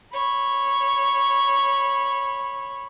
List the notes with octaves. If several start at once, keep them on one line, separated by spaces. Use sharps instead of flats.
C#5 B5